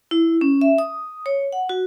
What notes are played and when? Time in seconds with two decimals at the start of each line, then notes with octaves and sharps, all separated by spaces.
0.11 E4
0.41 C#4
0.61 E5
0.78 D#6
1.26 C#5
1.53 F#5
1.69 F#4